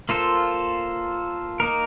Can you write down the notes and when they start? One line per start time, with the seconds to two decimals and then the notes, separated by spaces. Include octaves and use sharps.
0.09 A#3 F4 A4 C5
1.60 A#3 D#4 A#4